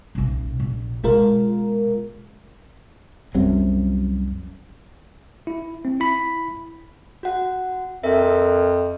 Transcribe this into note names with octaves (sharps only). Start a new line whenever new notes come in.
D#1 B1
A#1
B2 G#3 F4 A#4
C2 F#2 C3 F#3
E4
C4
E4 B5
F#4 F#5
F2 A#4 E5